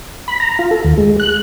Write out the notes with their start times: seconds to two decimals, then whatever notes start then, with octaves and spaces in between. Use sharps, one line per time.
0.28 B5
0.40 A#5
0.59 F4
0.71 A4
0.85 D#2
0.98 G#3
1.20 F#6